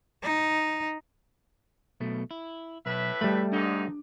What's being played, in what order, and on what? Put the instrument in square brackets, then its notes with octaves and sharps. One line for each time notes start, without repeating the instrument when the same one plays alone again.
[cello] D#4
[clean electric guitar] B1 B2 A3
E4
[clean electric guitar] B1 [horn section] A2 B4 E5
[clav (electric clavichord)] G3 A3 [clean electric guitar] B5
[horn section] G#2 D3 D#4 [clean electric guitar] D4